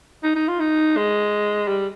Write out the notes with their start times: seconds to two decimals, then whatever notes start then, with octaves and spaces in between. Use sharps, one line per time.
0.23 D#4
0.35 D#4
0.48 F4
0.60 D#4
0.97 G#3
1.68 G3